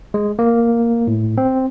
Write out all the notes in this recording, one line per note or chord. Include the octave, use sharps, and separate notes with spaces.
G#3
A#3
A2
C4